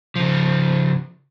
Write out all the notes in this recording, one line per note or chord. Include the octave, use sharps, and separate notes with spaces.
C#3 F3